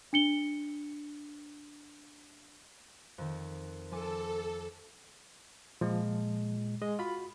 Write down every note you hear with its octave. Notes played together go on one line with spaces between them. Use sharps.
D4 C#7 G7
F2 D#3
F3 A4 G#5 D6
A#2 F3 G#3
G#3 D#5
F4 F#4 B5